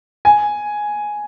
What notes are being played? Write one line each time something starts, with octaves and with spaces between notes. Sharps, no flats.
G#5